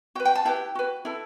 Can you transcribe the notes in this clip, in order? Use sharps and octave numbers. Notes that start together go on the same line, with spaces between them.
F#4 B4 G5
G5
A5
E4 G4 B4 G5
F#4 B4
E4 A4